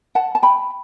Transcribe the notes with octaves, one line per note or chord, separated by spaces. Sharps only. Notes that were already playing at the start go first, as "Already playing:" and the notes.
F#5 A5
A5
G5 B5